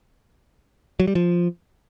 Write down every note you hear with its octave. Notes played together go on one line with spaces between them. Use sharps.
F#3
G3
F3